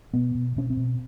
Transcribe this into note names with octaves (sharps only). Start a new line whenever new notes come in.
B2 B3
B2
B2 C#4
C4
B2